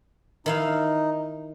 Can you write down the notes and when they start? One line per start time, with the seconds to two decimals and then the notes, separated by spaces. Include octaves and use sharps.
0.46 D#3 D#4 E4 F5